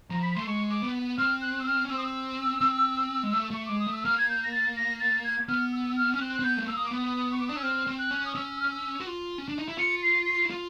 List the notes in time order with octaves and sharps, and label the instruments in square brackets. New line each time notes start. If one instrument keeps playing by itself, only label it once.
[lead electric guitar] F3 [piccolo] A#5
[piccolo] B5
[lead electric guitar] A3 [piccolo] C6
[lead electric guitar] G#3 [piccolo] C#6
[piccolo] D6
[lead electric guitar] B3
[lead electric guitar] C4 [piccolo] F6
[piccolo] F#6
E6
F6
[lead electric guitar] C#4
[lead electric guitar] C4 [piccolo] E6
[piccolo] D#6
E6
[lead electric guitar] C4
G#3
A3
[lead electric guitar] A3 [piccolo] C#6
[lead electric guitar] G#3 [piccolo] D6
[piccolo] D#6
[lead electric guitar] A3
[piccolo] E6
[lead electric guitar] A#3 [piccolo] F6
[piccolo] G#6
G6
A#6
A6
A#6
A6
G#6
[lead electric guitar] B3 [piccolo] F6
[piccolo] E6
F6
[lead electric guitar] C#4 [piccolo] F6
[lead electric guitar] C4 [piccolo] F#6
[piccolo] F#6
[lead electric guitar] C4
[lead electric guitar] B3 [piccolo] G6
[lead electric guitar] A3
[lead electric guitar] A#3 [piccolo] E6
[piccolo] D#6
D6
[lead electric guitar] B3 [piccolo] D#6
[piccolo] C#6
D6
[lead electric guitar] D4 [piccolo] D#6
[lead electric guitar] C#4 [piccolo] E6
[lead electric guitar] C4 [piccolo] F6
[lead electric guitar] C4
[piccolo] F#6
[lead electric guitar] C#4
[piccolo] D#6
[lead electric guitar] C#4 [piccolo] E6
[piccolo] F6
E6
[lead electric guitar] F#4
F4
C#4
D4
D#4
E4
[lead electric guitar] F4 [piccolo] C#7
[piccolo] C7
C7
[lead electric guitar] E4
F4